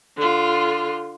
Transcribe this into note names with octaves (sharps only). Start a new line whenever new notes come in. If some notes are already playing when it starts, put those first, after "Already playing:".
D3 F4